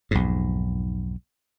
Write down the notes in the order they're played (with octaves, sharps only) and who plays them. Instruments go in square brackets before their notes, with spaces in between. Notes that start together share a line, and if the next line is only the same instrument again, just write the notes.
[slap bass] B1 F2 G#2